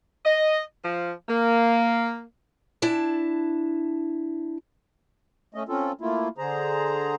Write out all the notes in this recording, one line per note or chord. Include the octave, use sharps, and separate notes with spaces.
D#5
F3
A#3
D4 E4 A5
A3 C#4 D#5
C4 C#4 F4 A4
A3 A#3 E4 F4
D3 G#4 C5 A#5